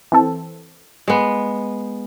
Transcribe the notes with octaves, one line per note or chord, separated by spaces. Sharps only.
E3 C4 A4
G#3 B3